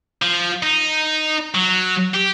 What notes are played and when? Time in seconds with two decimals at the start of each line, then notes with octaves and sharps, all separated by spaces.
0.22 F3
0.63 D#4
1.55 F#3
2.14 G4